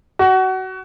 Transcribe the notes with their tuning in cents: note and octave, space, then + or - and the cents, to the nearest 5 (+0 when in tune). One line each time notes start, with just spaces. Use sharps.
F#4 +25